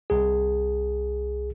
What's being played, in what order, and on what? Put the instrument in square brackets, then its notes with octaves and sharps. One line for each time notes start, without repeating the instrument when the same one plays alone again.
[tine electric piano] C2 G#4